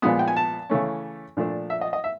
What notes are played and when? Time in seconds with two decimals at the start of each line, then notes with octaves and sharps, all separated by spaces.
0.02 A#2 F3 G#3 B3 D#6
0.19 G5
0.28 G#5
0.36 A5
0.70 C#3 E3 A3 C#4
1.37 A#2 F3 A3 D4
1.70 E5
1.81 D#5
1.93 D#5
2.04 E5